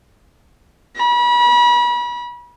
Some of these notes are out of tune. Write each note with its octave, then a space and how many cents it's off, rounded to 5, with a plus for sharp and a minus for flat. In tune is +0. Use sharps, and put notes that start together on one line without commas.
B5 -35